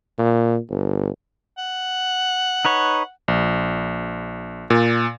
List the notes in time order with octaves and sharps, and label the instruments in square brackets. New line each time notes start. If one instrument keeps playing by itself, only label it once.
[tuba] A#2
G1
[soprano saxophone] F#5
[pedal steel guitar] D#4 B4 C#5
[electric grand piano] A#1
A#2